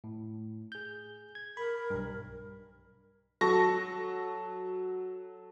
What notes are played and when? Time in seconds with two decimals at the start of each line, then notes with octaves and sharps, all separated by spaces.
0.04 A2
0.72 G#4 G6
1.35 G#6
1.57 A#4 B5
1.90 B1 G2
3.41 F#3 A4 C#6 A#6